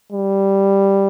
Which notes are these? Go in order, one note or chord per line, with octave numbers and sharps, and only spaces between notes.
G3